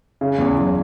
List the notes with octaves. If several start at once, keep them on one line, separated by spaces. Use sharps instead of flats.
C#3
E2
F#1